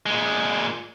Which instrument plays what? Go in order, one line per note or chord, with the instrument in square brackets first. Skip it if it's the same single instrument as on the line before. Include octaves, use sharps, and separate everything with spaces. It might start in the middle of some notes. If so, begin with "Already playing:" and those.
[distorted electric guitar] A#2 G#3